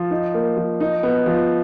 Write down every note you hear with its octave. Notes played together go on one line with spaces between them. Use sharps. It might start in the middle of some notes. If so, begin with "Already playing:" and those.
Already playing: F3
D#4
A#3
F3
D#4
B3
F3